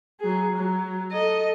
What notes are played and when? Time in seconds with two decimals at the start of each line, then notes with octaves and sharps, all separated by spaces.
0.20 F#3 G#4
0.57 F#3
1.12 A4 D#5